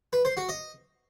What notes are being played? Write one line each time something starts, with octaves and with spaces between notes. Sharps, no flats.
B4
C5
F#4
D#5